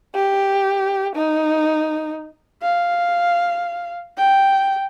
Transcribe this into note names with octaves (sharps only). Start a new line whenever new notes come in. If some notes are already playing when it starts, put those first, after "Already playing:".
G4
D#4
F5
G5